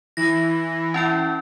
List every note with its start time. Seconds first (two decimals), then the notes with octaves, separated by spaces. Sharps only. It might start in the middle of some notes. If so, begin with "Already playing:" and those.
0.17 E3 A#6
0.94 C#4 E4 G5